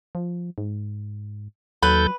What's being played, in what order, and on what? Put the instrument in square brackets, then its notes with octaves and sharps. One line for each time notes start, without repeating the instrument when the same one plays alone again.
[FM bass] F3
G#2
[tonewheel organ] D#2 A4 G6 [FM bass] F#3 [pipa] B4